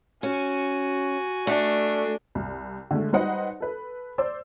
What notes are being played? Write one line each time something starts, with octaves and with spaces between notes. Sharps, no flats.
C#4 F#4 G#5
A3 D4
C2
D3 G#3 A3
G3 D#4 B4 C5 D#5 F#5
A4 B4
C5 D5 E6